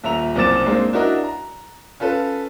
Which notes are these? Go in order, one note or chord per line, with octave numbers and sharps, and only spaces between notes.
D#1 E5 A#5 F7
F#1 C2 C4 D6 A6 E7
G#3 A#3 C4 D4 D#4
D4 E4 F#4 A#4 D#5
A#5
C#4 F4 A4 B4